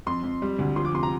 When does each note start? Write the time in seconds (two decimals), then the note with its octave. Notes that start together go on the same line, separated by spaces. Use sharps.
0.07 F2 C6
0.23 F2
0.42 G3
0.59 D2
0.76 F3 C6
0.85 D6
0.94 C3 C6
1.03 A#5